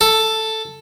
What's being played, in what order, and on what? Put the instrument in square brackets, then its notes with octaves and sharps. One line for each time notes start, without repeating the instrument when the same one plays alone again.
[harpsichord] A4